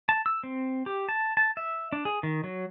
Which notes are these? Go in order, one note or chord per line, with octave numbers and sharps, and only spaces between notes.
A5
E6
C4
G4
A5
A5
E5
D4
G#4
D#3
F#3